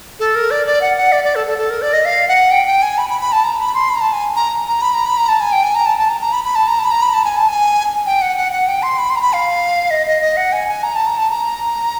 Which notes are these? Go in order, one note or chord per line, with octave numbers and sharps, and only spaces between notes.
A4
A#4
D5
D5
F#5
F#5
D5
D5
A4
A4
A4
A#4
D5
D#5
F5
F#5
G5
G5
G#5
B5
B5
B5
A5
A#5
B5
C6
B5
A#5
A5
G#5
A#5
A#5
B5
A#5
B5
A#5
A5
G#5
G5
G#5
A#5
A5
A5
A#5
A#5
B5
B5
A5
A#5
A5
B5
A#5
B5
A5
G#5
A5
G#5
G5
F#5
F#5
F#5
G5
C6
B5
C6
A#5
B5
F5
D#5
D#5
D#5
F#5
G#5
G#5
A#5
A5
A#5
A5
A#5